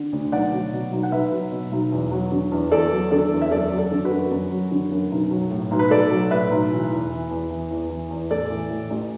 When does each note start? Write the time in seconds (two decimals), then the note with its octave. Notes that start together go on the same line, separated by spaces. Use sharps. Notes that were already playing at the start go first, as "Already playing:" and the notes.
Already playing: D3
0.13 D2
0.32 B1 D5 F#5
0.52 F#3
0.72 B2
0.92 B1
1.03 F#5
1.12 B1 B4 E5
1.32 F#3
1.51 B2
1.72 B1
1.92 E2
2.12 F#3
2.32 D3
2.52 E2
2.72 E2 A4 D5
2.92 F#3
3.11 D3 A4 D5
3.31 E2
3.42 E5
3.51 F#2 A4 D5
3.71 F#3
3.78 A4 D5
3.91 D3
4.05 F#4 B4
4.11 F#2
4.31 F#2
4.51 F#3
4.71 D3
4.91 F#2
5.12 B1
5.31 F#3
5.51 A2
5.71 B1
5.79 B4
5.91 B1 A4 D5
6.11 F#3
6.31 A2 B4 E5
6.51 B1
6.71 E3
6.91 E2
7.11 E3
7.31 E2
7.51 E3
7.71 E2
7.90 E3
8.10 E2
8.30 A1 A4 D5
8.50 E3
8.70 A2
8.90 A1